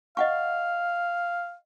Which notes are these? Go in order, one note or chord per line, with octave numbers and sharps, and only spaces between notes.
D#5 F5 F#5 C#6